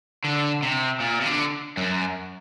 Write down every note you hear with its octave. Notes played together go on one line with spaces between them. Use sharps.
D3
C3
A#2
C3
D3
F#2